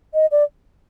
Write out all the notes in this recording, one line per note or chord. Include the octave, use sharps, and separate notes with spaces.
D#5
D5